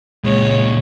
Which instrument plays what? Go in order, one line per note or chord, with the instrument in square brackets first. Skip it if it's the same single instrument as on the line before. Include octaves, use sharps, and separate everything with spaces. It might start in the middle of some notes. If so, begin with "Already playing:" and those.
[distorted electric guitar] C#2 A#2 [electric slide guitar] G#3 [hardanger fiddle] C#5